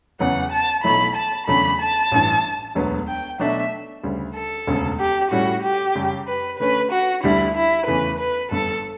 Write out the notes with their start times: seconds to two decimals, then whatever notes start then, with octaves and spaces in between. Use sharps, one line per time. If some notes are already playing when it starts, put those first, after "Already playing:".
0.19 E2 C#3 F#3 B3 F#5
0.52 A5
0.84 B1 B2 F#3 A3 E4 B5
1.15 A5
1.47 E2 C#3 F#3 A3 D4 B5
1.80 A5
2.12 A1 G2 E3
2.75 E1 D2 D3 F#3 B3
3.08 G5
3.39 B2 F#3 A3 D4 E5
4.03 D2 C#3 G3
4.35 A4
4.67 E1 D2 C#3
4.99 G4
5.31 A2 G3 C#4 E4 F#4
5.63 G4
5.95 F#2 C#3 G3 C#4
6.27 B4
6.59 D3 A3 C#4 B4
6.92 F#4
7.24 D2 D3 G3 D4 E4 G4
7.55 E4
7.87 E2 C#3 E3 A3 B4
8.19 B4
8.51 G1 G2 D3 A4